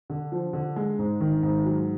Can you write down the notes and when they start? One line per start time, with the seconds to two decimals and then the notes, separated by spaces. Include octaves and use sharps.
0.10 D3
0.32 F3
0.53 D3
0.76 G#3
0.99 G#2
1.21 D#3
1.43 G#2
1.65 F#3